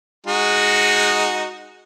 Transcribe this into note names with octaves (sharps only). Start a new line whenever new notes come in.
G#3 D#4 F#4